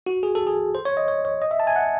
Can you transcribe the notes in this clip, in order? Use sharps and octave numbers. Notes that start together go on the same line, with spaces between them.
F#4
G#4
A4
G#4
C5
C#5
D#5
C#5
C#5
D#5
E5
A5
G#5
F#5